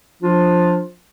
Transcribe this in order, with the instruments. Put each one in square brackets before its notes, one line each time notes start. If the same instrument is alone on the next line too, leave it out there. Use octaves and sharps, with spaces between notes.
[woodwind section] F3 D4 F4